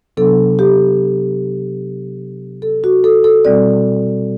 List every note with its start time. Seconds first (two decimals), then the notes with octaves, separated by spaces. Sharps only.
0.17 C3 F#3 B3 D4 A4
0.59 G4
2.62 A4
2.84 F#4
3.04 A4
3.24 A4
3.45 B2 G3 C4 D5